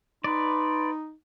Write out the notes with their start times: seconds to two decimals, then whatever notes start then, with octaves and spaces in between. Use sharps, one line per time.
0.24 D#4 B4 D5 C6